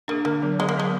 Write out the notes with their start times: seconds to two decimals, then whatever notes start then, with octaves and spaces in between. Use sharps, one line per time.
0.08 A#3 D4 G#4
0.25 D3 A#3
0.42 F#3 B3
0.59 D3 G#3
0.69 A#3
0.76 F#3 G#3 B3